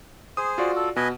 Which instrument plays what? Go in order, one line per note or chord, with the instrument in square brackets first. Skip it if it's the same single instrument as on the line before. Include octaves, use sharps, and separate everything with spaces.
[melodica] G#4 C5 [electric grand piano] D#6
[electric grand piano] F4 F#4 D5
[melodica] A4
[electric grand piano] B2 [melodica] B4 D#5 G#5